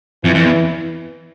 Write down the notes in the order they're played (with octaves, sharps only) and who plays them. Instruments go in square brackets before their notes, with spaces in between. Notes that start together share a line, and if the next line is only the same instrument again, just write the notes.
[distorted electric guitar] F2 [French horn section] E3
[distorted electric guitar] F2
E2